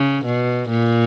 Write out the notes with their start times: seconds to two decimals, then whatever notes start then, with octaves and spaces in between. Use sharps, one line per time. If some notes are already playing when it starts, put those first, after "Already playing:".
Already playing: C#3
0.25 B2
0.69 A#2